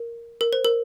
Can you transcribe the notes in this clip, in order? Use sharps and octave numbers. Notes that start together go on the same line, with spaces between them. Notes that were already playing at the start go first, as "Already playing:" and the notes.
Already playing: A#4
A#4
C5
A#4